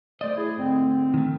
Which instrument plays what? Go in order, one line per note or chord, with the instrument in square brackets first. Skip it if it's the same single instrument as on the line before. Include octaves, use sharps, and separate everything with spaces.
[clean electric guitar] A3 D#5 [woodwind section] C5 D5
[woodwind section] E4 G#4
G#2 D3 C4
[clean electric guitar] D#3 A3